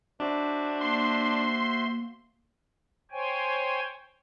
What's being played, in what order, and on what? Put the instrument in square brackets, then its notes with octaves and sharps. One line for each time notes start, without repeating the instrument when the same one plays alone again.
[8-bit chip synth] D4 [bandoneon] F#4 C5 E5
[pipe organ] A#3 [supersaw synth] C6
[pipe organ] C5 C#5 G5 G#5